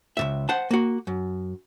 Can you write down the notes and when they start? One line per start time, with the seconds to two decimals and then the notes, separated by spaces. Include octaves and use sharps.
0.17 C#2 G#2 E5
0.49 C5 F#5 A5
0.71 A#3 F#4
1.07 F#2